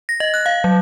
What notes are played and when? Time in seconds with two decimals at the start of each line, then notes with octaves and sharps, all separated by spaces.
0.09 A#6
0.20 D#5
0.34 F#6
0.46 F5
0.64 F#3